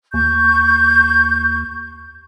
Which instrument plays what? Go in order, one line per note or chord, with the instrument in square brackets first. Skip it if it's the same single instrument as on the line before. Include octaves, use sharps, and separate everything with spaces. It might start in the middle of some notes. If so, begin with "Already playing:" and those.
[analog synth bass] D#2 [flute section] C#6 G6